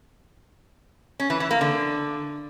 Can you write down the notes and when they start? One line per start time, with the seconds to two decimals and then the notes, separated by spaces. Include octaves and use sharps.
1.20 C#4
1.30 E3
1.40 E3
1.51 A#3
1.61 D3